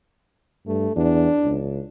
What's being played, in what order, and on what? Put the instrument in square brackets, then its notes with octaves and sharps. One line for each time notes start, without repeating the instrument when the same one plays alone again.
[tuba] G2 [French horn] A3
[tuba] E2 [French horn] D4
[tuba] C#2